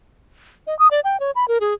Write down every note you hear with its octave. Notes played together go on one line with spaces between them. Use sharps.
D#5
D#6
D5
G5
C#5
B5
A#4
G#4